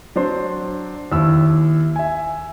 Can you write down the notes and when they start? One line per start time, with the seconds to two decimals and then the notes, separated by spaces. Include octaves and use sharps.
0.16 F#3 D4 C5
1.12 D#2 E4 E6
1.96 E5 G#5